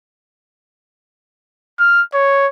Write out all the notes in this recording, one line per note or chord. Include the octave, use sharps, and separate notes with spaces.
F6
C#5